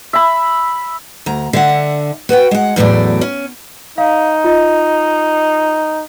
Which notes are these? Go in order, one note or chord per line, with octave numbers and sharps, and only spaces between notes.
E5 B5
D2 A#5
D3 E5 F#5
F#4 B4 F#5 G5
G#3 F#5
E2 A2 F#3 A3 D5
C#4
D#4 F5
F4 D#5